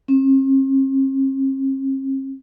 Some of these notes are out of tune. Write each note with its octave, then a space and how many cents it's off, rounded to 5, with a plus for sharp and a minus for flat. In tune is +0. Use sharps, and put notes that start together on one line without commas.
C4 +45